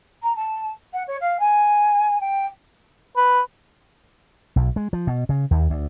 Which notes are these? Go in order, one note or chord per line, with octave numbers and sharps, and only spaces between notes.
A#5
A5
F#5
C#5
F5
G#5
G5
B4
B1
G#3
F3
B2
C#3
D#2
D2